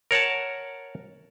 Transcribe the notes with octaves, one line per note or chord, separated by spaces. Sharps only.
A#4 C#5 F#5 A5